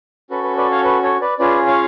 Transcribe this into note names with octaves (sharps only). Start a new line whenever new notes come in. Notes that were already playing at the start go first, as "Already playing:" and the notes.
C#4 F#4 A4 B4
B4
B4 D5
C#5 F5
B4
A4 C#5
B4 D5
C#4 F4 G#4 B4 D5
C#5 F5